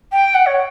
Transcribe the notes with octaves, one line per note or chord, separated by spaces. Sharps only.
G5
F#5
C#5